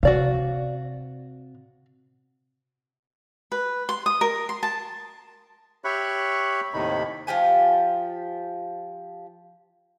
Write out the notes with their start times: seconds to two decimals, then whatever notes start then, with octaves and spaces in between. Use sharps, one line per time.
0.03 C3 F#4 D5 F5
3.52 B4
3.89 C6
4.06 D#6
4.21 A#4
4.49 C6
4.63 A5
5.85 G4 C#5 E5 B5 C#6 F#6
6.74 D#2 A2 C3 D#3 D#4 B5
7.27 F3 F4 G4 G#5